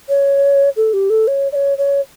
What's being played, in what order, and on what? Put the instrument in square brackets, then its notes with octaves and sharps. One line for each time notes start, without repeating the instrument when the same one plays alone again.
[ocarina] C#5
A4
G4
A4
C#5
D5
C#5
C#5